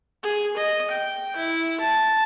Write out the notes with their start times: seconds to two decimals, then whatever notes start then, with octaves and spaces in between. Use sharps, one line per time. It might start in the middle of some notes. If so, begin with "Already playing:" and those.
0.23 G#4
0.57 D#5
0.90 G5
1.36 E4
1.80 A5